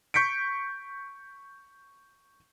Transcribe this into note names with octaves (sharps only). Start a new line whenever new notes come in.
C#6 G6 B6 C#7 D7